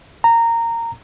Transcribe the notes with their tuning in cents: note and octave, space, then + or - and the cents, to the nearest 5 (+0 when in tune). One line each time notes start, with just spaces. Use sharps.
A#5 -15